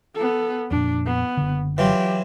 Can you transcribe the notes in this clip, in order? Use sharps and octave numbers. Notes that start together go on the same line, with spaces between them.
B3 A4
F2 A#2 D4
B3
F#1 D3
E3 F#3 F4 G4